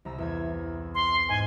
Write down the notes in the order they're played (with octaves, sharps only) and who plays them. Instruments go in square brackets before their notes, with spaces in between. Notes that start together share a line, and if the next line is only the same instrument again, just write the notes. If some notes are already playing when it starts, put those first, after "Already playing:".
[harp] C2 A#5 E6
E2 E5 G#6
[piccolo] C6
[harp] G#2 [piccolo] G#5